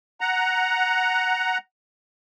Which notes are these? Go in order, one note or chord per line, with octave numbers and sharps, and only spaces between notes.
F#5 A#5